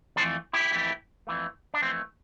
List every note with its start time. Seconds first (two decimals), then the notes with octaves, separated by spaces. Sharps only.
0.16 F2 E3 A3 A4 C5
0.53 E4 G4
0.71 F2 E3 A3
1.27 F2 E3 A3
1.74 D4
1.81 F2 E3 A3 C4